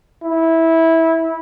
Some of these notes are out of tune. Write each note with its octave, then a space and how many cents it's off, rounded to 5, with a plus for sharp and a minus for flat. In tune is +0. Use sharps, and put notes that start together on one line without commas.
E4 -15